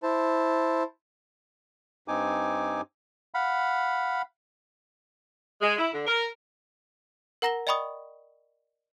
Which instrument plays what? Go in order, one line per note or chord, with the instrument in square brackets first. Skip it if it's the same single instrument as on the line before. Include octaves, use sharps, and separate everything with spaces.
[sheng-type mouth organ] E4 C5 A5
[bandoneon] G2 C4 D#4 G#5 D6
[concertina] F5 F#5 B5
[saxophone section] G#3
E4
D3
A#4
[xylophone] A#4 F#5 A#5 A#6 E7 G7
D5 D#5 G5 B5 C#6 D#6